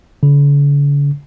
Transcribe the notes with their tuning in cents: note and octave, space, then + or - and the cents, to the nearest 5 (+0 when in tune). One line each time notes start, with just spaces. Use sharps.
D3 -45